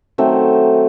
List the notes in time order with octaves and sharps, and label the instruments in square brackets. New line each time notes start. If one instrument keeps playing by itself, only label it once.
[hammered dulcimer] D#3 F#3 A3 C4